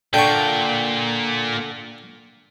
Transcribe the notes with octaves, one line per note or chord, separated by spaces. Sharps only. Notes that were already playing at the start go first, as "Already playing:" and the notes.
A#2 D3 A4 G5 C#6